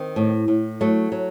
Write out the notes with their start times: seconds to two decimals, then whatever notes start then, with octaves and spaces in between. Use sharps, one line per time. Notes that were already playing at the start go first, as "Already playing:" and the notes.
Already playing: D#3 C4
0.16 A2
0.48 A2
0.81 F#3 A3
1.12 F#3